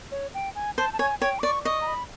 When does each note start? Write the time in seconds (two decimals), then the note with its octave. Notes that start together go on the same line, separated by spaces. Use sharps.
0.12 C#5
0.34 G5
0.55 G#5
0.78 C5 A5
0.93 A5
0.99 C#5 G#5
1.21 C#5 G5
1.39 D6
1.43 D5 C#6
1.65 D#5 C#6
1.81 A#5
1.87 B5